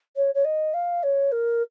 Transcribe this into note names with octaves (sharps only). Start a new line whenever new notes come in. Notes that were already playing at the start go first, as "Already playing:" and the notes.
C#5
C#5
D#5
F5
C#5
A#4